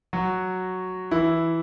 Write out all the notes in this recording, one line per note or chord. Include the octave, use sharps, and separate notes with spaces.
F#3 F#4
E3 E4